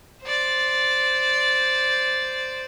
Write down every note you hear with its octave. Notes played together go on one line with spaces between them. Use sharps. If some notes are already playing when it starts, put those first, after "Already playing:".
C5 D5